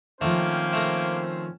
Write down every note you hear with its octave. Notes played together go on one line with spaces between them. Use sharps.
D#3 F3 A3 A#3 C4 C#4 C5
A3 A#4